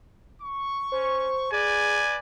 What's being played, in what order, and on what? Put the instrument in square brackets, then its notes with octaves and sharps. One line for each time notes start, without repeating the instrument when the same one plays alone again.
[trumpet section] C#6
[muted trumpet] C#4 [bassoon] C5
[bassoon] G#4 [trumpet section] B4 D5 [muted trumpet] G#5